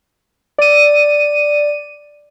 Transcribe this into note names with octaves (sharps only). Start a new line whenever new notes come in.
D5 D#7